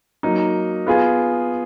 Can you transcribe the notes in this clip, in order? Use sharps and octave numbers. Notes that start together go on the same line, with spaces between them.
F#3 A#3 D#4
B3 F4 G#4